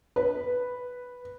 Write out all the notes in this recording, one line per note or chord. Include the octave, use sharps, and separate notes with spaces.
B4